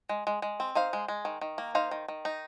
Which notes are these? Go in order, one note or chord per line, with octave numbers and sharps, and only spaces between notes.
G#3
G#3
G#3
C4
D#4 C5 F5
G#3
G#3
D#3
D#3
A#3
D#4 C5 F5
D#3
D#3
D#4